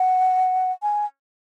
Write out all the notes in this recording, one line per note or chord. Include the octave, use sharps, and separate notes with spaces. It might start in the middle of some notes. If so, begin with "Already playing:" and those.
Already playing: F#5
G#5